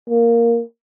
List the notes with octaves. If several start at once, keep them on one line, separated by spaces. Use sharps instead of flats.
A#3